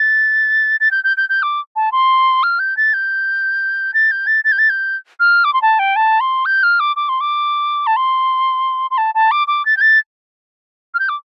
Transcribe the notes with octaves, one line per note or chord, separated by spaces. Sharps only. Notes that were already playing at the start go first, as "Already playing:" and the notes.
Already playing: A6
A6
G6
G6
G6
G6
D6
A5
C6
F6
G6
A6
G6
A6
G6
A6
A6
G6
A6
G6
F6
D6
C6
A5
G5
A5
C6
G6
F6
D6
D6
C6
D6
A5
C6
C6
A5
A5
D6
D6
A6
G6
A6
F6
G6
D6